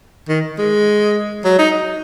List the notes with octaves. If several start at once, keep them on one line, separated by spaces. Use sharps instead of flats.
D#3
G#3
F#3
D#4